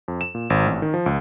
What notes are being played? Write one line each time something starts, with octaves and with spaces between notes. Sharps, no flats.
F2
E7
A#2
G#1
A1
D#3
F3
C#2